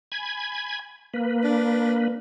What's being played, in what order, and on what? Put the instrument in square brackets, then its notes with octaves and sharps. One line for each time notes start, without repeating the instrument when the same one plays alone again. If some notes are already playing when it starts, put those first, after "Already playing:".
[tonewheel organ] G#5 B5 G#6
A#3 B4
[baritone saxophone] D4